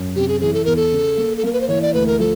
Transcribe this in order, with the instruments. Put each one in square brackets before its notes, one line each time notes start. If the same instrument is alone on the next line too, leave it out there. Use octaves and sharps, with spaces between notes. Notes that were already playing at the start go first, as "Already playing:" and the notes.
Already playing: [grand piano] F#2
[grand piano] C3 [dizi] G4
[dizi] G#4
[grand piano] E3 [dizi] G#4
[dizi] A4
[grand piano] E2 [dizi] A#4
[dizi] A4
[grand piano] C#3
A#3
[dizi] A4
[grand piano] A#3 [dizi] A#4
[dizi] B4
C5
[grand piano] E3 [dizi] C#5
[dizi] D5
[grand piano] D2 [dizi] B4
[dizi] A#4
[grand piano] F3 [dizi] A4